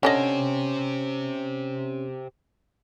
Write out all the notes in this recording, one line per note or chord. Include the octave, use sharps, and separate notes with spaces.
D3 C#4 D4 G4 C5 D#5